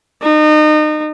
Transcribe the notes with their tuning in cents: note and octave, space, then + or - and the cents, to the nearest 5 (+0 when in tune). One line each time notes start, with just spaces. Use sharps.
D#4 -30